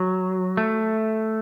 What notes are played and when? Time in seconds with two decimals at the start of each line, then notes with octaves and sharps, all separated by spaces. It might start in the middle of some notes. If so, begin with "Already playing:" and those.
Already playing: F#3
0.57 A3